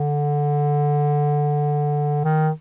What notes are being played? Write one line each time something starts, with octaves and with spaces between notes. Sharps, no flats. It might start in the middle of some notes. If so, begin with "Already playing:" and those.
Already playing: D3
D#3